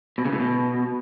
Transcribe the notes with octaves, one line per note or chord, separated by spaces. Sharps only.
B2
C#3
A2
B2